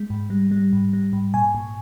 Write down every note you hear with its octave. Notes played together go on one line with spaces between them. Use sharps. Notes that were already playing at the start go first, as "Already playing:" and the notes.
Already playing: G#3
G#2
G3
G3
G#2
G3
G#2
A#2 G#5
A#2